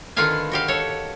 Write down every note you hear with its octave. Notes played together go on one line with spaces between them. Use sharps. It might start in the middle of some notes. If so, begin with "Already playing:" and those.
D3 D#3 F4 B4 F5 G#5
F#4 G4 F5
A4 C#5